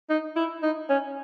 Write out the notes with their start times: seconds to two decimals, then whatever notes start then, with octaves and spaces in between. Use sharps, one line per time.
0.10 D#4
0.36 E4
0.63 D#4
0.89 C#4